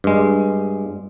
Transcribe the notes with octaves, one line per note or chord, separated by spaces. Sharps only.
G2 G#3